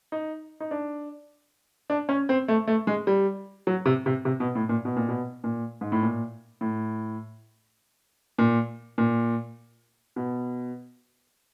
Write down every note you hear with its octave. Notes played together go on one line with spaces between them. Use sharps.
D#4
D#4
D4
D4
C#4
C4
A3
A3
G#3
G3
F#3
C3
C3
C3
B2
A2
A#2
B2
A#2
B2
A#2
G#2
A2
A#2
A2
A#2
A#2
B2